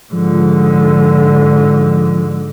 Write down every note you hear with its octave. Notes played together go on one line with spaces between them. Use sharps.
G#2 D3 F3